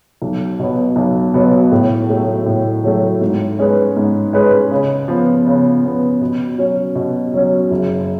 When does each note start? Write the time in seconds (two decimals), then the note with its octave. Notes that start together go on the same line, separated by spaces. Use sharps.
0.22 B1
0.59 B2 F#3 B3
0.96 B1
1.34 B2 F#3 B3
1.72 A2
2.09 F#3 A3
2.46 A2
2.84 F#3 A3
3.21 G#2
3.59 G#3 C#4 G#4 B4
3.97 G#2
4.33 G#3 C#4 G#4 B4
4.71 C#3
5.08 F3 B3
5.47 C#3
5.84 F3 B3
6.21 B2
6.58 F#3 C#4
6.95 B2
7.34 F#3 C#4
7.71 F#1